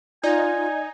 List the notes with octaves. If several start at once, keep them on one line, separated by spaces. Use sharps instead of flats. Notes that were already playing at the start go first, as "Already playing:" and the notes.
D#4 F4 D5 G#5